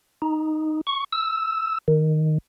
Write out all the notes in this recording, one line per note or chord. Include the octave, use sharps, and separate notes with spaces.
D#4
C#6
E6
D#3